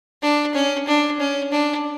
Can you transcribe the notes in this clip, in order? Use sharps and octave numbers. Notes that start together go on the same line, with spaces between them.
D4
C#4
D4
C#4
D4